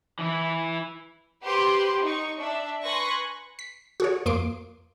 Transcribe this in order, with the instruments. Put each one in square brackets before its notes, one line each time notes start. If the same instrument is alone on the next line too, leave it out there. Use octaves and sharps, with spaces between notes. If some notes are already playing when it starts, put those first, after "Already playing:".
[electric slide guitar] E3 E4
[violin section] G4 B4 C5 C6
D#4 C#6
D4 E5
B4 G#5 C6 C#6 F#6 A#6
[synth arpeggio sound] B6
F#4 G#4 C#5
F2 A#3 C6 D6 D7